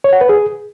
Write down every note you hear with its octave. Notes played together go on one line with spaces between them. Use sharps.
C#5
F#5
B4
G#4